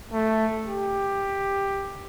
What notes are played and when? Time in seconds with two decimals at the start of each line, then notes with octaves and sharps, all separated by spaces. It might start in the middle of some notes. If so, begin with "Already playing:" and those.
0.13 A3
0.68 G4